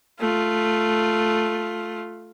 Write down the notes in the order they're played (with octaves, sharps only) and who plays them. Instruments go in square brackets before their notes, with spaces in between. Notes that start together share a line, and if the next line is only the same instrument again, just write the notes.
[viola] A3 F4